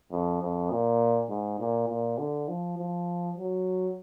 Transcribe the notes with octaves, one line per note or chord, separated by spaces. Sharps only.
F2
F2
A#2
G#2
A#2
A#2
D3
F3
F3
F#3